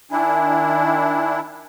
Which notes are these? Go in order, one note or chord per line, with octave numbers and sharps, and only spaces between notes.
D#3 D4 E4 G#5